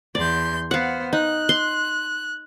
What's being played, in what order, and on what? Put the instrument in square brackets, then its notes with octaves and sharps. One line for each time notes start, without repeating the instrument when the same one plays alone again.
[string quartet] E2 C6 G6 [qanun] D5
[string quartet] B3 C5 [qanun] F5 F#5
[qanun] D#4 [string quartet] F#6
[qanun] C6